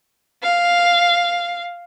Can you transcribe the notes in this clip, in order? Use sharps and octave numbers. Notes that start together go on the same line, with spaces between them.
F5